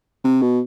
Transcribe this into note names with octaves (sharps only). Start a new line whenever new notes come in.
C3
B2